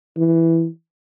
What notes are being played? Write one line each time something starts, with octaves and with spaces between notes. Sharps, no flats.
E3